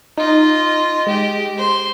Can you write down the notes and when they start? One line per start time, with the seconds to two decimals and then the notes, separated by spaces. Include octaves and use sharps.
0.17 D#4 F4 D#5
1.07 G#3 G4 D#5
1.57 C5 C6